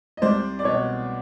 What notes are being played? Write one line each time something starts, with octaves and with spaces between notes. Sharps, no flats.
D#5
C2 C5 D5
D5
B2 C#5 D#5